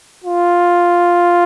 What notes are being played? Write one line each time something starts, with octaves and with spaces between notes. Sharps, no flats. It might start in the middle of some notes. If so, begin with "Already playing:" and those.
F4